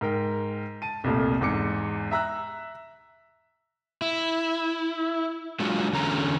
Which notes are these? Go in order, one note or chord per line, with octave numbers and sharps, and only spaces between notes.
G#2 A#4 G5
A5 D#7
C2 F2 A#2 A3
E2 G#2 D6 C#7
E5 A#5 E6 F#6
E4
F#3 G#3 D4 F4 F#4
E2 D3 C#4 A#5